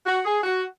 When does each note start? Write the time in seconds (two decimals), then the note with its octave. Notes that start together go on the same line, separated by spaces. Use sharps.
0.06 F#4
0.25 G#4
0.44 F#4